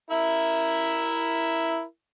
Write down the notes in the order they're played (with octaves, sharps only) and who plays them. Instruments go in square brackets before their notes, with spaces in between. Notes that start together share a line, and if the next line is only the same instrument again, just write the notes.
[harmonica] E4 A#4 E5